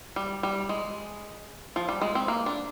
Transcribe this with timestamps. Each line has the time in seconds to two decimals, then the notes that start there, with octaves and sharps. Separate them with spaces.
0.16 G3
0.43 G3
0.69 G#3
1.76 F3
1.89 G3
2.01 G#3
2.15 C4
2.28 A#3
2.46 D4